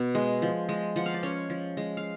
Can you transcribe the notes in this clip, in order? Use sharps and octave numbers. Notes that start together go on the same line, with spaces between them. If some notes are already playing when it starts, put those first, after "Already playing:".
Already playing: B2 B3
G#3
F3
G#3
F3 F#5
F5
D5
C#4 C#5
F3
G#3
F5